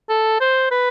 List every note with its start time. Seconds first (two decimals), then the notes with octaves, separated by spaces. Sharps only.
0.09 A4
0.40 C5
0.71 B4